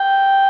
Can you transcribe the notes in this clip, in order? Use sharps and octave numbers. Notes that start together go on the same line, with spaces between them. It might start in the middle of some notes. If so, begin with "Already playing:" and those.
Already playing: G5